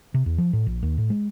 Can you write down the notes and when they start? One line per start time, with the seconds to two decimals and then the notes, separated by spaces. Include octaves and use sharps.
0.14 C3
0.26 E2
0.38 F3
0.53 A2
0.66 A#1
0.83 D#2
0.98 A2
1.10 G#3